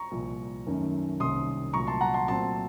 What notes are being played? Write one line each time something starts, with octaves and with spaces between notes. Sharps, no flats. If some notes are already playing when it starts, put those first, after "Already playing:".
Already playing: A#5 C#6
C2 A#2 F3
F#2 D#3 A3 C#4
C2 C3 D#3 A#3 C#4 C6 D#6
C2 A#2 F#3 A3 A#5 C#6
A5 C6
F#5 A#5
A5 C6
A#2 F#3 A3 C4 A5 C6